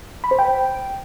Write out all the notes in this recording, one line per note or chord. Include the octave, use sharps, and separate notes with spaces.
B5
C5
G5